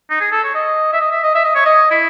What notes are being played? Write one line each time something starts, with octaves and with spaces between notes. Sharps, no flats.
D#4
G#4
A4
C#5
D#5
E5
D#5
E5
D#5
E5
D#5
C#5
D#5
E4